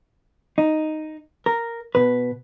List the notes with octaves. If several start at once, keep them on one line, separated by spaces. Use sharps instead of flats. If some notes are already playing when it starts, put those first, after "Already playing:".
D#4
A#4
B2 B4